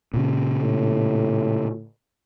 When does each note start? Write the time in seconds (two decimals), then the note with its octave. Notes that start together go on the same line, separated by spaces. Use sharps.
0.14 A#2 C#3
0.59 A2